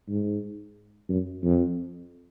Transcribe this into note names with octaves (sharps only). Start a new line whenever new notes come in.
G#2
F#2
F2